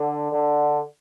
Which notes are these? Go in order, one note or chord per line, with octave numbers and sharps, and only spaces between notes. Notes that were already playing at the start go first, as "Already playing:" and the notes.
Already playing: D3
D3